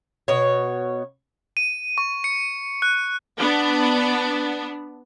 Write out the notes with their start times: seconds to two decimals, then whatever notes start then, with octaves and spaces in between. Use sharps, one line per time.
0.28 B2 C#5
1.57 D#7
1.98 C#6
2.24 C#7
2.82 F#6
3.38 B3 D4